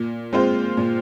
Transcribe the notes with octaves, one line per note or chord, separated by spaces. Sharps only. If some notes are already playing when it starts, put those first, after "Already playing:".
Already playing: A#2
G#3 C4 F4 C5
A#2